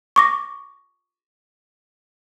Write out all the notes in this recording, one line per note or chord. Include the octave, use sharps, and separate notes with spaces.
C#6 D6 A#6